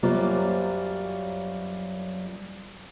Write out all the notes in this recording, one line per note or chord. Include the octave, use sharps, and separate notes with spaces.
F#2 F#3 G3 A#3 F4 C5